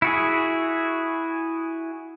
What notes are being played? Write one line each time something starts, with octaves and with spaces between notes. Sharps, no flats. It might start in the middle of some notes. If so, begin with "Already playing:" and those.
E4 F#4 G#4